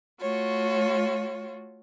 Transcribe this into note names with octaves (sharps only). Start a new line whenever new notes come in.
A3 F4 F#4 C#5